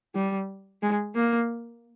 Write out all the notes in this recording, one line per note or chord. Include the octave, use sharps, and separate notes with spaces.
G3
G#3
A#3